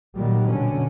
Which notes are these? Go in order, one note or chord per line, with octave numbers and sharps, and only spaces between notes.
A#2 D#3 F#3 G3
B2 D3 C#4